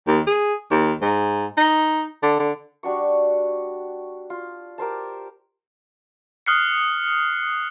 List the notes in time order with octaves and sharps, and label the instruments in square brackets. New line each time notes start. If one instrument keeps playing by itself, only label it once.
[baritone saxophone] D#2
G#4
D#2
G#2
D#4
D3
D3
[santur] G3 D4 F#4 C#6
F4
G4 A#4 C5 A5
[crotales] D#6 F6 F#6 C7 C#7